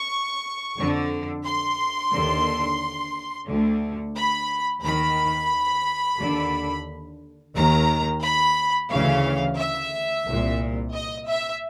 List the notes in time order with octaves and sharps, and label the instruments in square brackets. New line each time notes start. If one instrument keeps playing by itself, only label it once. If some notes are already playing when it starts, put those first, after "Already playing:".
Already playing: [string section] C#6
F2 D3
C6
D#2 D3
D2 D3
B5
D#2 D#3 B5
D#2 D3
D#2 D#3 A#5
B5
D2 C#3 E3 F5
E5
C2 A#2
D#5
E5